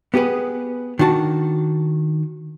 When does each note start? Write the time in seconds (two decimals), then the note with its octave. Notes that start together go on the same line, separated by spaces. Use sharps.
0.14 B3 G4 G#4 B4
0.99 D#3 D4 F#4 A5